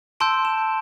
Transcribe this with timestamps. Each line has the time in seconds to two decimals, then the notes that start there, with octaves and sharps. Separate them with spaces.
0.20 A5 C6 E6 G6 D7
0.45 E7